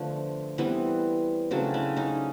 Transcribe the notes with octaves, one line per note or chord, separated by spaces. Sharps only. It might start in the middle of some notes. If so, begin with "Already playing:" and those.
Already playing: D3 F3 A3 B3
E3 G3 B3 C4
C#3 F#3 A3 C4 D4
D4 E4
C#4 D#4